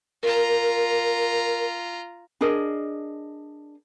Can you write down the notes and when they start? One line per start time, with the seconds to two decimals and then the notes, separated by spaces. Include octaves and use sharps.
0.23 F4 A#4 A#5
2.41 D4 G#4 A#4 D#5